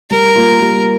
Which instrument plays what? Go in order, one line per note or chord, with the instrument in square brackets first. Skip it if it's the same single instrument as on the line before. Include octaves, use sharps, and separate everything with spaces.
[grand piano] G3 [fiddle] A#4
[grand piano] A#3 F4
G3